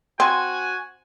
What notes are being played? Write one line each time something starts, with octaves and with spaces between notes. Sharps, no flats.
C4 F#4 G#5